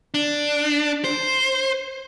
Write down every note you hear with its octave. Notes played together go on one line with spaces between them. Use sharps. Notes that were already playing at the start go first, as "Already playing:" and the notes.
D4
C5